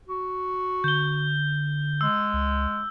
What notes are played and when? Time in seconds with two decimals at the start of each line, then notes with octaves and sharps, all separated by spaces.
0.08 F#4
0.84 D3 G6 G7
2.01 G#3 E6
2.34 C#2